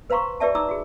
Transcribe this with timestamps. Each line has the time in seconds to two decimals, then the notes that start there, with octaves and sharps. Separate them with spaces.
0.10 B4 C5 F5 A#5 C6 C#6
0.40 G4 B4 D5 E5 A5
0.55 D#4 A#5 D6 E6
0.68 F#4 G#4